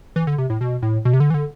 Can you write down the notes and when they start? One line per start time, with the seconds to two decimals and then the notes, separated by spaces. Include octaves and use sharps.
0.16 E3
0.27 D3
0.38 C3
0.50 A2
0.61 B2
0.82 A2
1.05 B2
1.13 C3
1.20 D3
1.30 E3
1.34 D3